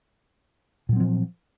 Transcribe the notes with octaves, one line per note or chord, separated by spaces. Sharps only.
A#2 F3 F#3 C4